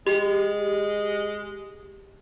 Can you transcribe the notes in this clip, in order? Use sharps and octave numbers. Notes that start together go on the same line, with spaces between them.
G#3 G4